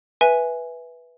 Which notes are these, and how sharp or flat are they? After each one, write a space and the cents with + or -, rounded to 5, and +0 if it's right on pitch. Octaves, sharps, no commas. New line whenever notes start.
B4 -5 E5 +0 G#5 +0